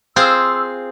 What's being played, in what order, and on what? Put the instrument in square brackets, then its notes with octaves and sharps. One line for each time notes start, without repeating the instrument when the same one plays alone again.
[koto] C4 [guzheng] F4 G#4 C5 [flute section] E6